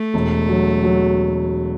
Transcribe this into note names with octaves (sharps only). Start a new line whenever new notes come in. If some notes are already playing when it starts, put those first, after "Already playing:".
Already playing: A3
E1
F#3
F#3